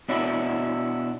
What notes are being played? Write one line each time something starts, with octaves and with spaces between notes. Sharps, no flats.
B2 D4 E4 F#4